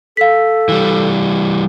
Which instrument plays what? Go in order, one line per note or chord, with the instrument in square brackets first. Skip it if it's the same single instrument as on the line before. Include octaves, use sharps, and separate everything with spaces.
[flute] A4 [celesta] F5 B6
[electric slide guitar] E3 G3